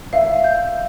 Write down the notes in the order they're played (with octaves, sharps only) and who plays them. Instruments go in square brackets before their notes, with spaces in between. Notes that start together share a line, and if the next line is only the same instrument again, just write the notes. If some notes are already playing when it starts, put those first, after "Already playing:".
[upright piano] E5 [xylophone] F5
[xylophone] G6